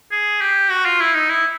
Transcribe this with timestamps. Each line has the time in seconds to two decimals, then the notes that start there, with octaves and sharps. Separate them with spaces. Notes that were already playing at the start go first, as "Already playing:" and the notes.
0.11 G#4
0.41 G4
0.70 F#4
0.85 F4
1.00 E4
1.15 D#4
1.30 E4